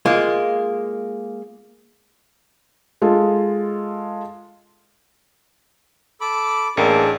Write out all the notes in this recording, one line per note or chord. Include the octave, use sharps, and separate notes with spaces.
G#3 A#3 F4
G#3 F4 A4
A4 B5 D6
A1 A#3 D4 G#4 A4 G5 C#7